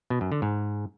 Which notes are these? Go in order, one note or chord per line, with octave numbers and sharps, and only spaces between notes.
B2
F#2
D3
G#2